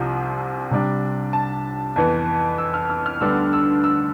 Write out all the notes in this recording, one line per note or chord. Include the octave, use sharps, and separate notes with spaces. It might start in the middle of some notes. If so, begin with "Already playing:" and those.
Already playing: C2 C3 F3 C4
C3 G3 D4
A5
F2 E3 B3
E6
F6
F6
F6
D2 D3 G3 B3 D4 E6
E6
E6